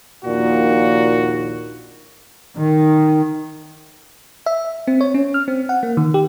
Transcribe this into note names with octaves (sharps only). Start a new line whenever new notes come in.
A#1 D#2 A#2 F#4
D#3
E5
C4
C#5
C#4
F6
C4
F#5
A#3
D#3
G4